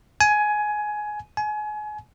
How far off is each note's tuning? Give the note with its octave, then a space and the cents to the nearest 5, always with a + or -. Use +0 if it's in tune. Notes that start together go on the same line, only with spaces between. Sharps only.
G#5 +15
G#5 +30